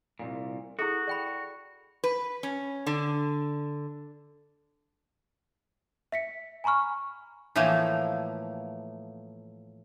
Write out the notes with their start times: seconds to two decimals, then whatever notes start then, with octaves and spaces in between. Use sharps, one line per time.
0.19 C2 F2 A#2
0.79 E4 F#4 G#4 A4
1.07 D5 G5 B5
2.04 B4
2.43 C#4
2.87 D3
6.12 E5 B6 C#7
6.64 G#5 A#5 B5 C#6 F6
7.56 A2 E3 F3 A3 A#3